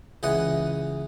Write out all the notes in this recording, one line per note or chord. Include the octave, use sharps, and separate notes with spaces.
C#2 E3 D#5 F#5